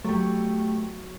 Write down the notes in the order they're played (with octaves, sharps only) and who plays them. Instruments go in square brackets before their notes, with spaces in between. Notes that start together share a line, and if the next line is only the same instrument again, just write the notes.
[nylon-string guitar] F#3 B3 [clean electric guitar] A3 G4